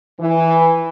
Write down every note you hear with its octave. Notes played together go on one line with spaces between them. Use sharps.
E3